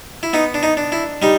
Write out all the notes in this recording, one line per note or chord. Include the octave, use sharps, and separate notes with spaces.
E4
B3 D#4
D4
D#4
D4
E4
G3 D#4